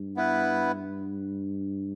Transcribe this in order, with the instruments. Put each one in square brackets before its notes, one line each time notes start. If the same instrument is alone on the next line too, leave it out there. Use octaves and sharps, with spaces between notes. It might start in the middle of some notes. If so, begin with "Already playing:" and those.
Already playing: [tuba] G2
[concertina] B3 E4 B4